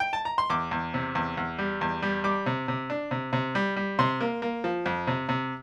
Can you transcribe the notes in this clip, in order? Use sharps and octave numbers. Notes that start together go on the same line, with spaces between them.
G5
A5
A#5
C6
E2 D6
E2
C3
E2
E2
G3
E2
G3
G3 D6
C3
C3
D4
C3
C3
G3
G3
C3 C6
A#3
A#3
F3
F2
C3
C3